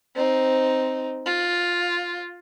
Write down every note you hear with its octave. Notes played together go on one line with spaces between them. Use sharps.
C4 D#4
F4